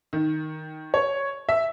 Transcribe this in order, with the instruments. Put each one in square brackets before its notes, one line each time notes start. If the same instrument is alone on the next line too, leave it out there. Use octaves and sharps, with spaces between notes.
[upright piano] D#3
C#5
E5